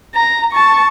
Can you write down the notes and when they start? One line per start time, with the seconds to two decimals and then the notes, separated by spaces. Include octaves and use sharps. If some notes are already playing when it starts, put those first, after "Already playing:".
0.15 A#5
0.52 A5 C#6